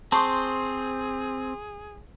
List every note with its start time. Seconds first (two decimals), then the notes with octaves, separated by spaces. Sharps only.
0.12 C4 G#4 C5 A5 C6 C#6 D#6